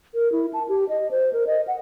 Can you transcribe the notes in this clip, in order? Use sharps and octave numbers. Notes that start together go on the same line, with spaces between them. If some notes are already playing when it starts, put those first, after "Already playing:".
A#4
E4
A5
G4
D#5
C5
A#4
D#5
F#5